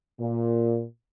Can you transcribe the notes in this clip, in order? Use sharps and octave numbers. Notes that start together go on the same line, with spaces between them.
A#2